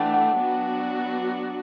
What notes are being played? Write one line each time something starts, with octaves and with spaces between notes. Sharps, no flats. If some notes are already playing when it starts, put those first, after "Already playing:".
Already playing: E3 A3 D4 F#5 G5 A5
F#5
F#3 B3 D4 F#4